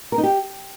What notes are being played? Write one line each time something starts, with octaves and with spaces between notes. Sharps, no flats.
A#4
D#4
G4